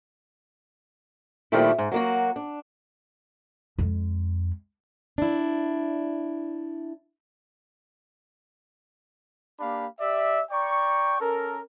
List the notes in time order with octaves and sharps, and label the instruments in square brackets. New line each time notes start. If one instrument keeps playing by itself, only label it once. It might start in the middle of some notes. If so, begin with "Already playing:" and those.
[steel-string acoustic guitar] A#2 D#3 F3 G3 A3 E4
G#2
F#3 A#3 F#4
D4
[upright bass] F2 G#3
[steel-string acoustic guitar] D4 E4
[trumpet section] A#3 D4 G4 F5 B5
G4 D5 E5
D5 G5 A#5 C#6
C#4 A4 A#4